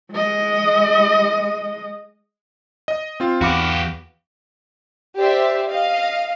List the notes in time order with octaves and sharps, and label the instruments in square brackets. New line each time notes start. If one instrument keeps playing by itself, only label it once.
[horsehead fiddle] G#3 D#5
[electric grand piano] D#5
C4 F4
[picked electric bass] E2 [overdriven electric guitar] F#4 G4 [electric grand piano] F5 B5 D6
[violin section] G4 C5 D5 E5
D#5 F5